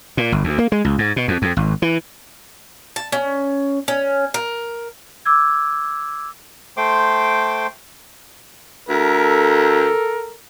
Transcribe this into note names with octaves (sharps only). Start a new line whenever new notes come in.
A#2
G1
D2
A#3
G#3
C#2
G#2
B2
F2
F2
G#1
E3
A5
C#4
C#4
A#4
D6 E6 G#6
A3 C5 G5 C6 D6
D2 A4 A#4